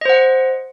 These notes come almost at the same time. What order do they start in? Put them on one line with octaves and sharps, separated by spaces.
D#5 C5 F#5